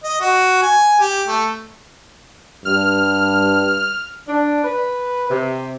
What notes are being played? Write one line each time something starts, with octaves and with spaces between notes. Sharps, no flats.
D#5
F#4
G#5
G4
A3
G2 F6
D4
B4
C3